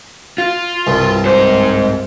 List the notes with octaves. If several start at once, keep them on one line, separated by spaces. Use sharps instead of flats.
F4
C2 G2
G#2 C5